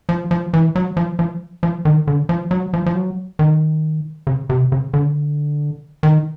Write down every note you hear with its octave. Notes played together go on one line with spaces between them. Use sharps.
F3
F3
E3
F#3
F3
F3
F3
D#3
D3
F3
F#3
F3
F3
F#3
D#3
C#3
C3
C#3
D3
D#3